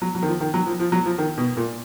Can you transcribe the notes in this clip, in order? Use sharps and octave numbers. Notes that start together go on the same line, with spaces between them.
F#3
F#3
D#3
F3
D#3
F#3
F3
F3
F#3
F3
D#3
B2
A#2